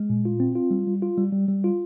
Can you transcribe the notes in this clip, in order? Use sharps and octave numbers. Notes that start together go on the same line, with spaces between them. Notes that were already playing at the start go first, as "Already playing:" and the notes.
Already playing: G#3
A#2
F4
C4
F4
G3
G3
F4
G3
G3
G3
F4